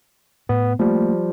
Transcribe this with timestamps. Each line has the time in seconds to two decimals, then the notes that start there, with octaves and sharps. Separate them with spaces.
0.49 A2 B3
0.79 F3 G3 A3 A#3